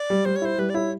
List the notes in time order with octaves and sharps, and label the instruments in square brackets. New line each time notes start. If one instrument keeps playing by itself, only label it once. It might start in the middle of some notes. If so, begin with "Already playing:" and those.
Already playing: [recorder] D5
[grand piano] G3
[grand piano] G3 [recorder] C5
[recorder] C#5
[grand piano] E4 [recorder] C5
[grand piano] G3 [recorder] B4
[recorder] D5
[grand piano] E4 [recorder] C#5